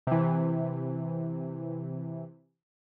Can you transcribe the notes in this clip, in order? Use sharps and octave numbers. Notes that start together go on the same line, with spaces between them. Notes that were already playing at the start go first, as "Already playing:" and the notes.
C3 E3